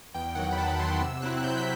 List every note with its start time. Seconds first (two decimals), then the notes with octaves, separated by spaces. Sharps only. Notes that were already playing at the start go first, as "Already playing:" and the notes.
0.15 E2 G5
0.35 D#3 F#3 F#5
0.53 B5
0.58 E2 A5
0.79 D#3 F#3 C6
1.01 C3 E6
1.22 F#3 C4 E4 F#6
1.37 F#6
1.44 C3 G6
1.58 B6